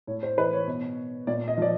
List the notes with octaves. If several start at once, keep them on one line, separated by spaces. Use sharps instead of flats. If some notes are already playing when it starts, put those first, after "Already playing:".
A2 C#5
C5
E3 B4
C#5
B2
A#2 D5
D#5
F3 D5